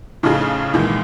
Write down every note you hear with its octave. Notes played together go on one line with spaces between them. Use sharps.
A2 C#3 F3 D#4 F4 G#4
C2 A#2 D#3 E3 G#3